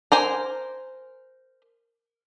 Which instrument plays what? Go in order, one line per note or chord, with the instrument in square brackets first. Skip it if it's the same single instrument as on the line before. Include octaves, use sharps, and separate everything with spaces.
[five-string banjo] A#4 C5 G#5